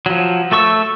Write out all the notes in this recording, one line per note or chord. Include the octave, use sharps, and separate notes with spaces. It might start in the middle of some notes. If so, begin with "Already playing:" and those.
F3 F#3
A3 A4 C#6 E6